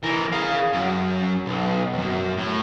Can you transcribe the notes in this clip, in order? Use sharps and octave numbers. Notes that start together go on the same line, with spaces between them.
E3 A#4
G#4 F5
F#2
B1
B1 F#2
A2